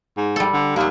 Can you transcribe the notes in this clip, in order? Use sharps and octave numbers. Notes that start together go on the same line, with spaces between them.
G#2
G3 A4
D3
D#2 F#3 A#3